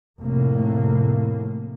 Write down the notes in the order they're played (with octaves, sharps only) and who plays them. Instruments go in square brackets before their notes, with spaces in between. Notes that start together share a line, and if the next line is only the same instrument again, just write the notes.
[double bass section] F1 A2 A#3